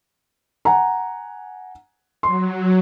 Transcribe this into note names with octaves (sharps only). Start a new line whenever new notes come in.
F#5 G#5 A#5
F#3 C6